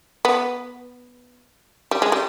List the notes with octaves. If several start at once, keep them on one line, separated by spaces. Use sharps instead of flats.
B3
G3
G#3
G3